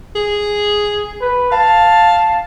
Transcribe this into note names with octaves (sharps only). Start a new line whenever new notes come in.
G#4
B4
F5 A5